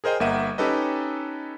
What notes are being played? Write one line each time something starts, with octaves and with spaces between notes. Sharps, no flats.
G#4 A#4 C5 D#5 G5
G1 A#3 A#4 E5 F#5 D#7
C#4 D#4 G4 A4 B4 D#5